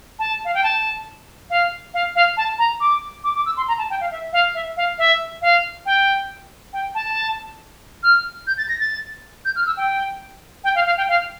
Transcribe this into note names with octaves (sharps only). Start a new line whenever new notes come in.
A5
F5
G5
A5
F5
F5
F5
A5
A#5
D6
D6
D6
E6
C6
A#5
A5
G5
F5
E5
F5
E5
F5
E5
F5
G5
G5
A5
F6
G6
A6
A#6
A6
G6
F6
E6
G5
G5
F5
F5
G5
F5